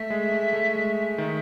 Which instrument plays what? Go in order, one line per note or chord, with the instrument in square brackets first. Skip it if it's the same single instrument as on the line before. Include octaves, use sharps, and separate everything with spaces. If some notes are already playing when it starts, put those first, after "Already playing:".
Already playing: [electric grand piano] A3 [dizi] E5
[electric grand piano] G#3
A3
A3
G#3
D#3